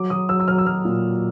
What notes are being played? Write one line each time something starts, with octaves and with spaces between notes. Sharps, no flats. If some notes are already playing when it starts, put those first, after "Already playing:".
Already playing: F#3 D6
F#3 D#6
F#3 E6
E6
F#3 F6
E6
F#3 F6
A#2